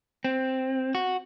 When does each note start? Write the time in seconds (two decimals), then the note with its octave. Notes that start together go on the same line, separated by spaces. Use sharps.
0.24 C4
0.95 F#4